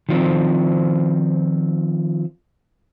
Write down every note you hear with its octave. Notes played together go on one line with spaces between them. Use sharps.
D#3 F3 C4